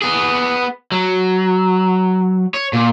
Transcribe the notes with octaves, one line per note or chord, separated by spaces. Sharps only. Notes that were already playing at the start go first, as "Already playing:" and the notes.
B3 G#4
F#3
C#5
A#2